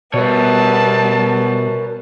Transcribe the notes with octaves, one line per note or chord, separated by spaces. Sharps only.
B2 G3 B3 A#4 C#5 A5